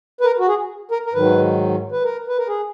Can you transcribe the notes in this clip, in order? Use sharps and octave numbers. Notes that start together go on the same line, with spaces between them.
B4
A#4
F#4
G#4
A#4
A#4
G#2 D#3 F#3 B4
B4
A#4
B4
A#4
G#4